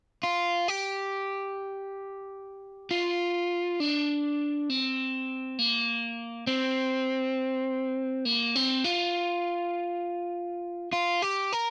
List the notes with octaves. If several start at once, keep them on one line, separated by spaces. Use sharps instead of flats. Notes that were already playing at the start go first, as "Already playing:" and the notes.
F4
G4
F4
D4
C4
A#3
C4
A#3
C4
F4
F4
G4
A#4